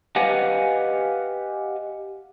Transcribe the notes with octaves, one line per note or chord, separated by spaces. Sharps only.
G4 B4 D#5 F5 F#5 G#5